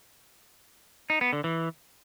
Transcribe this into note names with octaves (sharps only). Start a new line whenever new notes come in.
D#4
B3
D3
E3